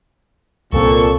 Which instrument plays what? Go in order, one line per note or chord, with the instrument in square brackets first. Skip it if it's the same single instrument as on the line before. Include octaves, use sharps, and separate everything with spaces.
[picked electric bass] C2 C4 [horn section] A#2 [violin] A4 C#6